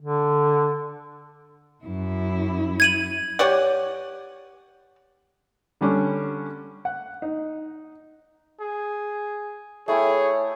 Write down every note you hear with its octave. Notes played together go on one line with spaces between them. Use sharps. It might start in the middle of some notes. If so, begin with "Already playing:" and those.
D3
F#2 E4
G#6 D#7 F#7
G4 C#5 D5 F#5
D3 G3 C#4 D4
F#5
D#4
G#4
A3 E4 G#4 C#5 G5